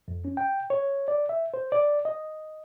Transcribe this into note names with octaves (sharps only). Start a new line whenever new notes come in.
F2
C#4
G5
C#5
D5
E5
C5
D5
D#5